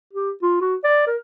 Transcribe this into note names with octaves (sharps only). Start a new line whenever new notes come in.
G4
F4
F#4
D5
A#4